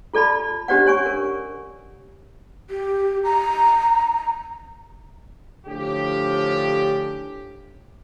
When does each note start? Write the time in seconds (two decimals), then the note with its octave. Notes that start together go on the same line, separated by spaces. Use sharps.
0.13 F4 A4 D5 A5 B5
0.68 C#4 D4 G4 C5 D5 F#5
0.86 C#5 G#5 C#6
1.06 A#4
2.70 G4
3.24 A#5
5.67 A2 D3 F3 C#4 G4